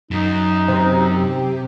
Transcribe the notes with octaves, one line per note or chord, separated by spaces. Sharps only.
F#2 D#4
C3